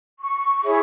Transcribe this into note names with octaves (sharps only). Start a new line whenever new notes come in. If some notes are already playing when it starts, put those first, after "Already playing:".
C#6
E4 G#4 C#5